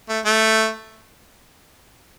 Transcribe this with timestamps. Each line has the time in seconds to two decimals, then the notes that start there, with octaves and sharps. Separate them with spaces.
0.09 A3
0.25 A3